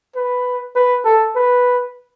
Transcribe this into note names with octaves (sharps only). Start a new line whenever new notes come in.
B4
B4
A4
B4